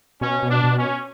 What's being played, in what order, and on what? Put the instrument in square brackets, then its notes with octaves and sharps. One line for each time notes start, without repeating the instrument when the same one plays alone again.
[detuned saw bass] B2 [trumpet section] C#4
[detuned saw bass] B2
[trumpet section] D4
[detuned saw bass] B2
[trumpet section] C#4